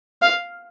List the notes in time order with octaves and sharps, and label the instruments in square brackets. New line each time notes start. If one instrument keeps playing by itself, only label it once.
[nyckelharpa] F5